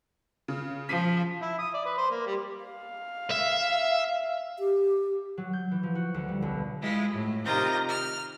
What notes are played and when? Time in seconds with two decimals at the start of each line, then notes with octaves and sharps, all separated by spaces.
0.48 C#3
0.89 F3 B6 D#7
1.42 E4
1.58 D#6
1.74 D5
1.85 B4
1.98 C5
2.11 A#3
2.26 G3
2.65 F5
3.31 E5
4.59 G4
5.37 F#3
5.53 G6
5.71 E3
5.83 F3
5.95 F#4
6.14 D2
6.28 G3
6.42 B1
6.82 G#3 E4 F4
7.11 A2
7.44 C3 D#3 D#4 F4 G6 A#6
7.88 F6